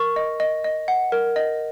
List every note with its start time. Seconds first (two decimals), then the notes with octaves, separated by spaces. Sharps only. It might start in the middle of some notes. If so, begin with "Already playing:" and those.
Already playing: A#4 C#6
0.16 D#5
0.40 D#5
0.64 D#5
0.88 F#5
1.12 A#4
1.36 D#5